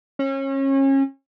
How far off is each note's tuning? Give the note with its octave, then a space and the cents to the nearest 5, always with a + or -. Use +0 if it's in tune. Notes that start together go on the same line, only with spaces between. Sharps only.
C#4 -30